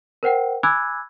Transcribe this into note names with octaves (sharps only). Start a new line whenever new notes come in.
A#4 C5 F#5 G5
G#5 B5 D6 E6 F#6 G#6